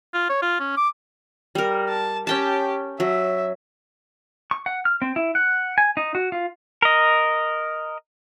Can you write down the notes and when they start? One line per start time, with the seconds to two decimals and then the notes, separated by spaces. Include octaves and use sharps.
0.14 F4
0.30 C#5
0.42 F4
0.60 C#4
0.77 D6
1.55 G3 A#4
1.89 A5
2.27 C#4 G4 G5 A5
3.00 F#3 E5
4.51 C#6
4.66 F#5
4.85 F6
5.02 C4
5.16 E4
5.35 F#5
5.78 G#5
5.97 D#4
6.15 F#4
6.32 F4
6.82 A#4 D#5